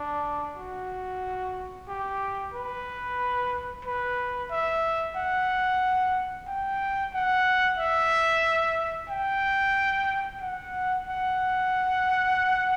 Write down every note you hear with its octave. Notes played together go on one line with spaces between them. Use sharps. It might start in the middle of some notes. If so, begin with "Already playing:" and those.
Already playing: D4
F#4
G4
B4
B4
E5
F#5
G5
F#5
E5
G5
F#5
F#5